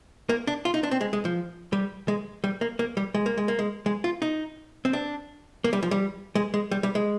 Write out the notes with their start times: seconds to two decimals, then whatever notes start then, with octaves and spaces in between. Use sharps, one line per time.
0.29 A#3
0.47 D4
0.65 F4
0.74 D#4
0.83 D4
0.91 C4
1.01 G#3
1.13 G#3
1.25 F3
1.73 G3
2.08 G#3
2.44 G3
2.61 A#3
2.79 A#3
2.97 G3
3.15 G#3
3.26 A#3
3.38 G#3
3.48 A#3
3.59 G#3
3.86 G#3
4.04 F4
4.22 D#4
4.85 C4
4.93 D4
5.64 A#3
5.73 G3
5.83 F3
5.91 G3
6.35 G#3
6.54 G#3
6.71 G3
6.83 G3
6.95 G#3